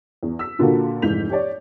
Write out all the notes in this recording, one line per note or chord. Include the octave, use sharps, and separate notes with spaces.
E2
E6 B6
A#2 D3 A#3 F4 F#4 A4
F1 G#2 E3 G6 B6 F7
G4 C#5 D5